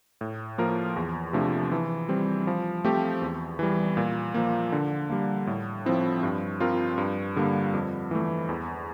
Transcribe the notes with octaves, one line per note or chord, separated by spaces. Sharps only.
A2
F3 A#3 F4 A#4
E2
C3 F3 A3 D4
E3
G3 C4
F3
A3 C4 G4
E2
E3 G3
A#2
F3 A#3
D3
G3 A#3
A2
F3 C4 E4
G2
F3 C4 F4 A#4
G2
D3 G3 A#3
F2
E3 A3
E2